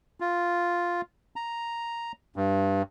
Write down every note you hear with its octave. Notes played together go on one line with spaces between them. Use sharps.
F4
A#5
G2